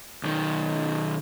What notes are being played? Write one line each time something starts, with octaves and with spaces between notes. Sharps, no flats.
B1 D#3